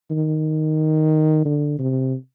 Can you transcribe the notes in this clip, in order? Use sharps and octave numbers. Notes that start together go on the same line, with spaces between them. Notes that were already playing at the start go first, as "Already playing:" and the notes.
D#3
D3
C3